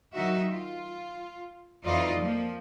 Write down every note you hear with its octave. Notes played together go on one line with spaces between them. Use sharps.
D#3 F#3 D#4 F#4 E5
F4
F2 E3 D#4 F4 D5 D#5
F3 A#3